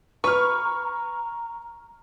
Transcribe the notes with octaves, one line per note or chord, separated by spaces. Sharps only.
B4 A#5 C#6 F6